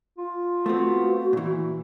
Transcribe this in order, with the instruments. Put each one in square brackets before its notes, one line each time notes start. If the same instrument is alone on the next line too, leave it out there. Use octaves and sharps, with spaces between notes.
[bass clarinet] F4
[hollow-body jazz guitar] A3 B3 C4 [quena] F#4
[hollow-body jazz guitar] A#2 E3 [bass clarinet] E4